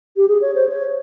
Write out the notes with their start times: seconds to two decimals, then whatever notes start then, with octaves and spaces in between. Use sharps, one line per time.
0.17 G4
0.28 G#4
0.42 C#5
0.55 C5
0.69 C#5